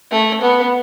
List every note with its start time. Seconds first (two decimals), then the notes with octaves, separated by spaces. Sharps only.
0.11 A3
0.41 B3